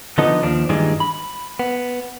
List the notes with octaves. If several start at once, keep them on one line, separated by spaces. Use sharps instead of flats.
D3 F3 B3 D#4 A4 D#5
D#2 F3 D4
G2 A#2 D#3 E3 G3 G#3
B5
B3